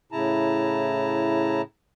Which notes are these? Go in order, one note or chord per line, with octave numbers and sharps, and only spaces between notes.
A2 C#3 E4 A5 A#5